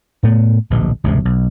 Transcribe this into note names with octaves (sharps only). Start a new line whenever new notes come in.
A2 A3 B3
D1 A#1 B2
E1 C#2 G2 C3
B1